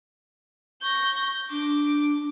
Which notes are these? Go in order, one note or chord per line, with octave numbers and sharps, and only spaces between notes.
C#6 G6 A#6
D4 D6